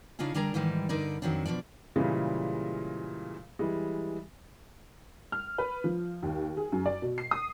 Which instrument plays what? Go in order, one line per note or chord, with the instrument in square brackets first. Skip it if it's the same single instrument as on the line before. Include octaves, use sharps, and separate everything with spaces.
[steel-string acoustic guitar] C#3 D4 D#4 F4 G#4
D3 G3 D4 G#4 A#4 A#5
G#2 D#3 E3 G3 G#3
G2 D3 D#4 A#4 D5
F2 A#2 D#3 F#3 C4 D4
B2 E3 F3 D4 D5
[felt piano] A#2 C#3 E3 G3 G#3
E3 G3 G#3
[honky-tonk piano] F6
B4
F3
D#2
G#4
F#2
D5
B2
C7
D#6